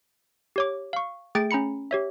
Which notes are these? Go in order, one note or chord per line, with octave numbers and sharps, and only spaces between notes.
G4 C#5 D6
F5 C#6
A3 G#4 G5 A6 D7
C#4 A#5 B5 C#7
G4 C#5 E5